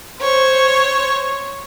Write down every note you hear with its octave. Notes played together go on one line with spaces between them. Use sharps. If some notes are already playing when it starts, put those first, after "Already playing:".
C5 C#5